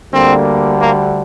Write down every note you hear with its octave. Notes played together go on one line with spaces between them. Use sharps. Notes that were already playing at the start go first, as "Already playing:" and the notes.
D2 D3 G3 A#3 C4
A#3